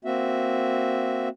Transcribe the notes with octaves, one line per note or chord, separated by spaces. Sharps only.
A#3 C4 F#4 E5